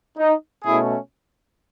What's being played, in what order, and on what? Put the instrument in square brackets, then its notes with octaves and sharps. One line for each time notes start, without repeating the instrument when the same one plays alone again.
[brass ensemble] D#4
B2 A3 C#4 E4 G#4